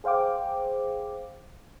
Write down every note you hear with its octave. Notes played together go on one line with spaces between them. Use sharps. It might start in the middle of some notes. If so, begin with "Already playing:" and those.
G#4 C5 F5 G5 D6